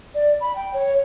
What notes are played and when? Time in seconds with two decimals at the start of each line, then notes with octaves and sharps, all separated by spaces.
0.15 D5
0.41 B5
0.56 G5
0.74 C#5